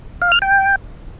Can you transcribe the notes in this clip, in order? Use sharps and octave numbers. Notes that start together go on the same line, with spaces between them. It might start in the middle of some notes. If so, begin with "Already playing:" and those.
F5
F6
G5